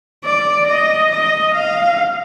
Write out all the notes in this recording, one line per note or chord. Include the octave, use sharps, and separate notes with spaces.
D5
D#5
D#5
F5